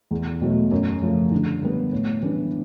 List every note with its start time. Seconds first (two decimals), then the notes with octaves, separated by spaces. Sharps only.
0.11 E2
0.41 B2 F#3 A3
0.71 F#2
1.02 C#3 F3 A3
1.32 D3
1.62 G3 B3
1.92 A2
2.22 E3 G3 B3 D4